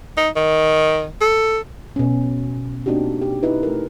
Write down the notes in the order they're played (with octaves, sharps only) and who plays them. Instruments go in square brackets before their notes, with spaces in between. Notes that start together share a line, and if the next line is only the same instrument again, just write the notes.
[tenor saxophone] D#4
D#3
A4
[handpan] B2 C#4
A#3 C4 D4 D#4 F#4 G4
G4
D#4 E4 B4
A3 A4 A#4